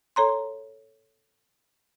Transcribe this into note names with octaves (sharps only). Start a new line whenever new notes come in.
A4 C#5 A#5 C6